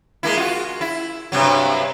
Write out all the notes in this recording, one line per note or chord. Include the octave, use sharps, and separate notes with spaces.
G#3 A#3 E4
F4 F#4
E4
G2 C3 F#3